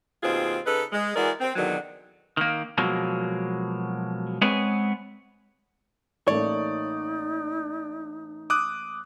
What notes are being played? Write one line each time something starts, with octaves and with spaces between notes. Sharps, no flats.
D#2 B2 C4 F4 G#4
C#3 D#4 A4 B4
G#3
E3 G#3 F#4 A#4 D5
C4
E2 B2 D3 D#3 F#3
D#3 A#3
B2 F3 F#3 G#3 A#3
G#3 B3 C4 G#4 B4 C#5
A1 A3 A#3 D#4 C#5 D5
D6 D#6 F#6